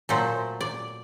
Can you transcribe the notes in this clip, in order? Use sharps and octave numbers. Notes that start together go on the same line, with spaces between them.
A#2 F#3 A3 C5
D5